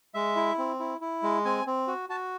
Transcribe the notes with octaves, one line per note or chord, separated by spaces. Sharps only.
G#3 E5
E4
C4
E4
E4
G#3
C4 G#5
C4
F#4
F#4 A5